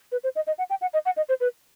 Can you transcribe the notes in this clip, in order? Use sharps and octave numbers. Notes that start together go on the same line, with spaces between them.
B4
C5
D#5
D#5
F#5
G5
F#5
D#5
F#5
D#5
C5
B4